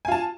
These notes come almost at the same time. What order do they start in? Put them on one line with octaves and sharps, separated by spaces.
G#5 F4 A5